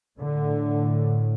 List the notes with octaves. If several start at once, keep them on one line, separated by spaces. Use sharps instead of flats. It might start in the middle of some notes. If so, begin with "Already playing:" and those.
A2 D3